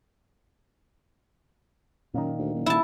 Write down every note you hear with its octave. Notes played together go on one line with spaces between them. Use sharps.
F#2 A#2 D#3
D2
F#1
D#1 E4 A5